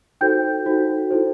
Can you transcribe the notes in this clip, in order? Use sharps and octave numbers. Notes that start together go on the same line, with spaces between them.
D#4 F#4 A4 C5 G5 G6
D#4 F#4 A4 C5
E4 A4 C5